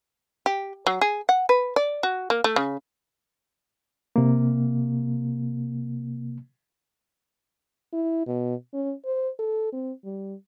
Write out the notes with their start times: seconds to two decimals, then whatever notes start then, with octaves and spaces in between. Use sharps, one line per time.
0.46 G4
0.87 F#3
1.01 G#4
1.29 F#5
1.49 B4
1.76 D5
2.03 F#4
2.30 A#3
2.44 A3
2.56 C#3
4.16 C3 A#3
7.93 E4
8.27 B2
8.73 C#4
9.05 C5
9.39 A4
9.73 C4
10.05 G3